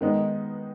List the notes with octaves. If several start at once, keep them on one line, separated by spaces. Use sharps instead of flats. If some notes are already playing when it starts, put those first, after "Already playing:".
D#3 G#3 B3 D#4